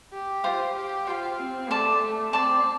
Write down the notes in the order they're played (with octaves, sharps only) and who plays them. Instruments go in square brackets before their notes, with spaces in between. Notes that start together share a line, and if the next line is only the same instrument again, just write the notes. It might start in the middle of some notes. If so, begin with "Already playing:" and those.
[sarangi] G4
[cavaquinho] F4 C5 F5 C6
[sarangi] G4
[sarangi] F4 [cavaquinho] C5 G5 C6
[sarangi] C4
[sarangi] A3 [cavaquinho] D5 A5 C6
[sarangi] A3
[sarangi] C4 [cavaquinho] D5 A5 C6